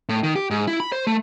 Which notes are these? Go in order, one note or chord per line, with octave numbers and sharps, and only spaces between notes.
A2
D#3
G4
G#2
E4
B5
C5
A3